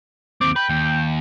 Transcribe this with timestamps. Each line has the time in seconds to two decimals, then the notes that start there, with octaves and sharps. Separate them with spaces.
0.41 D#2 C4 D6
0.56 B4 G5
0.69 D#2